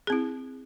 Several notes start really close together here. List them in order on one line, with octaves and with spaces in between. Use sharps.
G#4 C4 E4